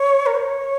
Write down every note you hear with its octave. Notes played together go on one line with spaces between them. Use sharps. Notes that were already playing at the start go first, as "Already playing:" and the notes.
Already playing: C#5
A#4
C5
C#5